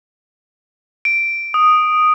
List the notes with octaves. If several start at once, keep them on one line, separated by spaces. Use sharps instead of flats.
D7
D#6